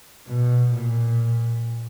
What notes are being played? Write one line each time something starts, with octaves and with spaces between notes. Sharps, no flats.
B2
A#2